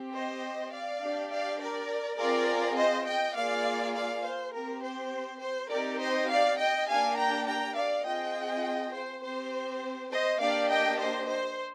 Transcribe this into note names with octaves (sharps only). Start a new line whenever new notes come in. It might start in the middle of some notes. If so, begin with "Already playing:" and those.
Already playing: C4 G4
C5 D#5
D5 F5
D4 G4
D5 F5
A#4 D5
C4 F4 G#4 A#4 D5
C5 D#5
D#5 G5
A#3 F4 G#4 D5 F5
D5 F5
C5
C4 G4 A#4
C5
C5
C4 D#4 G4 A#4 D5
C5 D#5
D5 F5
D#5 G5
A#3 D4 G4 F5 G#5
G5 A#5
G5 A#5
D5 F5
C4 F4 G#4 D#5 G5
C5
C4 G4 C5
C5 D#5
A#3 D4 G4 D5 F5
D#5 G5
C5 D#5
C5